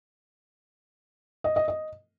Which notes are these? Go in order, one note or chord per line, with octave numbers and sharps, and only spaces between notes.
D#5
D#5
D#5